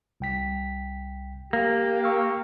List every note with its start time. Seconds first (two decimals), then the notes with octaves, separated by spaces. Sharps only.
0.20 C2 G5 B6
1.53 A#3 G4
2.04 C#6 E6 F6